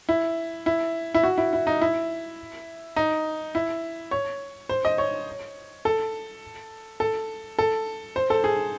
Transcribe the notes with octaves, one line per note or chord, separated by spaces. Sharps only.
E4
E4
E4
F#4
E4
E4
D#4
E4
D#4
E4
C#5
C5
D#5
C#5
A4
A4
A4
C5
A4
G#4